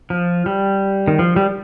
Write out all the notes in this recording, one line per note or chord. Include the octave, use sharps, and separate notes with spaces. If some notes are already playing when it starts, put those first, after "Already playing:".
F3
G3
D#3
F3
G3